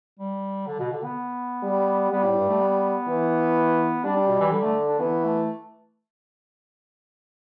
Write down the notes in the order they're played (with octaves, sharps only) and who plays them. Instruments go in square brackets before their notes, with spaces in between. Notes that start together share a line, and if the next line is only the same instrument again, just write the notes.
[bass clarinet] G3
D3
B2
D3
B3
[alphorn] G3
[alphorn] G3 [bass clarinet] B3
[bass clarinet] A2
G2
A3
B3
[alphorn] E3
[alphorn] G3 [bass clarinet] D4
[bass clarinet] D4
B2
E3
[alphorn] D3 [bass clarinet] G3
[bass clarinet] A3
D4
[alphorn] E3 [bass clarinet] B3
[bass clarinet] A3